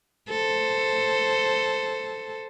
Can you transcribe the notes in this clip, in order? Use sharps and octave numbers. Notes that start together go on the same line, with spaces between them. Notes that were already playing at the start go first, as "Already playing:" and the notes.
A4 C5